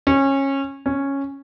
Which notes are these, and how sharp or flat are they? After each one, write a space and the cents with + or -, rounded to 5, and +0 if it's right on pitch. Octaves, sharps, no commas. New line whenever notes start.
C#4 -20
C#4 -5